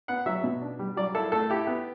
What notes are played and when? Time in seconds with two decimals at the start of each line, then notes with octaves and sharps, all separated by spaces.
0.08 B3 F#5
0.26 F#3 E5
0.44 B2
0.62 D4
0.79 G3
0.97 F#3 D5
1.15 E4 A4
1.32 A3 A4
1.50 E4 G4
1.67 B3